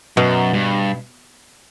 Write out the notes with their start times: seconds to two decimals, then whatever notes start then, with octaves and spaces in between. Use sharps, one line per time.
0.17 F#2 B2
0.53 G2